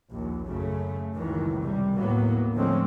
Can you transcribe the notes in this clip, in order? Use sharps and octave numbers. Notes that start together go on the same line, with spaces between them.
A#1 D#2
F#2 C#3 A3
F#1 C#2 D#3 E3
C3 G3
D#2 A2 F#3 A#3 B3
D3 F3 G#3 A3 C4 C#4